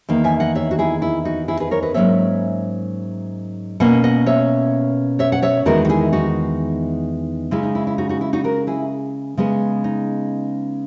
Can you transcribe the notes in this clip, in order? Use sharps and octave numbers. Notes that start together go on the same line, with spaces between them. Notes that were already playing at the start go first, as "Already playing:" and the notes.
E2 D#3 A#3
E5 G#5
D#5 F#5
C#5 E5
F#4
E4 G#4
E4
D#4 F#4
E4 G#4
G#4 B4
A#4 C#5
B4 D#5
G#2 D#3 F#3 A#3 C#4 C#5 E5
B2 A#3 C#4 D#5 F#5
D#5 F#5
C#5 E5
C#5 E5
F#5
C#5 E5
E2 D#3 G#3 B3 F#4 A#4
F#4
E4 G#4
D#4 F#4
C#3 G#3 C#4 E4
D#4
E4
E4
D#4 F#4
D#4 F#4
E4
D#4 F#4
F#4 A#4
E4 G#4
C#3 G#3 B3
D#4